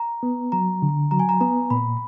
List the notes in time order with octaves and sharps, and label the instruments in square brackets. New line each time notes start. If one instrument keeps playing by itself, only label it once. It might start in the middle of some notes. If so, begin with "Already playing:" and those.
Already playing: [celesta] A#5
[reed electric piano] B3
[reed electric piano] F#3 [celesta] A#5
[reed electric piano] D3
[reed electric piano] F#3 [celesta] A#5
[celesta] G#5
A#5
[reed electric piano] B3 [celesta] A#5
[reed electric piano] A#2 [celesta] B5